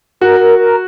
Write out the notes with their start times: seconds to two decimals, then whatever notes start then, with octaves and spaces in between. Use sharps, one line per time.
0.21 F#4 A#4
0.40 A#4
0.59 A#4